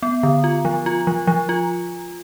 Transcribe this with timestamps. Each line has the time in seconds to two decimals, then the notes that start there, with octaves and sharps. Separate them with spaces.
0.03 B3
0.23 D3
0.44 F4
0.65 F3
0.86 F4
1.07 F3
1.27 F3
1.49 F4